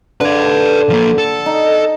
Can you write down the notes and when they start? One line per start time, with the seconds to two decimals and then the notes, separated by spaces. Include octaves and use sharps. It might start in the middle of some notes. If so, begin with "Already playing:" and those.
0.21 D3 B4 D5
0.90 F3 A#3
1.18 A4
1.46 D#4